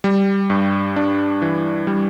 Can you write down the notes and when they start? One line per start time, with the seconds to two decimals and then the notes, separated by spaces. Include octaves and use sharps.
0.04 G3
0.50 G2
0.96 D4
1.42 E3
1.87 G3